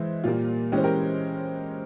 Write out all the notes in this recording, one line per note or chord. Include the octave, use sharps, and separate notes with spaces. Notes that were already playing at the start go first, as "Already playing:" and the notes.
Already playing: E3 G#3 E4 C5 E5
A#2 G3 A#3 F4
E3 G#3 C#4 G4
C5
G4 A#4